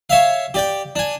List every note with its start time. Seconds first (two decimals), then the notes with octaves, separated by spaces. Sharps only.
0.10 C#5 E5 F5
0.54 G4 D5 G5
0.96 D4 G#5